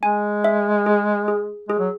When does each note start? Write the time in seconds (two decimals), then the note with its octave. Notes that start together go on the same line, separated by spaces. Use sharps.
0.03 G#3 G#5
0.44 E5
0.86 G#4
1.28 G#4
1.69 G#3 G#4
1.79 F#3